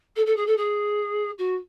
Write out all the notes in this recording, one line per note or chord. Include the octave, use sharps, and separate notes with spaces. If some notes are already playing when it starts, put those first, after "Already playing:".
A4
A4
G#4
A4
G#4
F#4